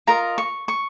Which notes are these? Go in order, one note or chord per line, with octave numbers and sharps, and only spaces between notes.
F4 A#4 D#5 A#5
C#6
C#6